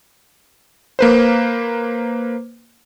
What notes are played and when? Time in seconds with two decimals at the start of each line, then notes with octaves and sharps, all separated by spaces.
0.99 A#3 B4 C5